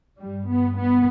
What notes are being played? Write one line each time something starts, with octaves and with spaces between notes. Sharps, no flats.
G2 G3
B3
B3